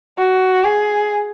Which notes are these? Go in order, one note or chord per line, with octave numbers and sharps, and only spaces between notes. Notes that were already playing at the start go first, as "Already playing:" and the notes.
F#4
G#4